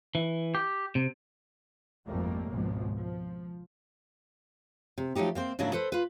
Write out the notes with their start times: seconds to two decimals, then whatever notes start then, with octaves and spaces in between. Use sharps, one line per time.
0.15 E3
0.55 G4
0.95 C3
2.07 G#1 F2 G#2 G3 A3 A#3
2.50 G#1 C#2 B2 F3 G#3
2.97 F3
4.98 C3
5.15 F3 F#3 A3 D#4 G4
5.35 A#3 C4 C5
5.59 G#2 C#3 F#3 A#3 D4 E4
5.73 A4 B4 C5
5.92 F4 B4